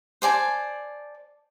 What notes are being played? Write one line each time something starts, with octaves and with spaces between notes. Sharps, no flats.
C5 D5 G#5 A5